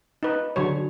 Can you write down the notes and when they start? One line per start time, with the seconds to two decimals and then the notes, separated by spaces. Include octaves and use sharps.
0.23 D#4 B4
0.56 D3 F#3 C#5